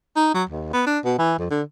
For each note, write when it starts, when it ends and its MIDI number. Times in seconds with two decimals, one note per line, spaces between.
0.16 0.30 63
0.35 0.44 54
0.49 0.72 39
0.73 0.85 59
0.87 0.99 62
1.05 1.14 47
1.19 1.36 52
1.39 1.48 41
1.51 1.62 50